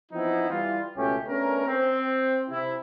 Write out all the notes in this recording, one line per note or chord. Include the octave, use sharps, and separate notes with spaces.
E3 F3 B3 C4 D#4 E4
E3 G3 F4
C#2 B2 A3 C#4 G4
A3 B3 C#4 D4 A#4
C4
C3 E4